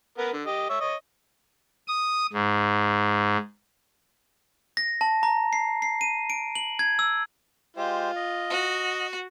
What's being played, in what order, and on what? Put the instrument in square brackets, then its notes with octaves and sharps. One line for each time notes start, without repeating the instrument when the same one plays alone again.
[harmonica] B3 A#4 B4
D3
G4 D#5
C#5 E5
C#5 D#5
[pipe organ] D#6
G#2
[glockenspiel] A#6
A5
A#5
C7
C7
D#7
D7
F#7
G#6
E6
[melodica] G#3 G4 C5 [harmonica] F4
[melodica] D#5
[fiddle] F#4